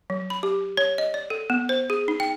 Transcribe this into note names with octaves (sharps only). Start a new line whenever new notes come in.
F#3
B5
G4
C#5
D#5
D5
A4
B3
C5
G#4
D#4
G5